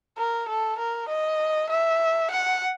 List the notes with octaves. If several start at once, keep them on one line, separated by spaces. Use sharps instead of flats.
A#4
A4
A#4
D#5
E5
F#5